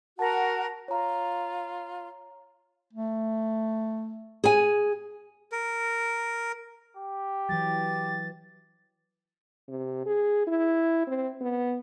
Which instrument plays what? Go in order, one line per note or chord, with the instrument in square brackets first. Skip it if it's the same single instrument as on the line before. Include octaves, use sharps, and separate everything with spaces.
[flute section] F#4 A#4 F#5 [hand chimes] A5 A#6
[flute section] F4 [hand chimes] C#5 A#5
[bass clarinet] A3
[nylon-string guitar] G#4 G#5
[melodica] A#4
[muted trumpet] G4
[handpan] E3 F#3 [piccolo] A6
[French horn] C3
G#4
E4
C4
B3